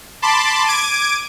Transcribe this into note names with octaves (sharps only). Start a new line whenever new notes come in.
A5 B5 C6 D6
D6 G#6 D7 D#7